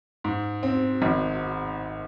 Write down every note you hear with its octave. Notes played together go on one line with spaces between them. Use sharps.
G#2
C4
G#1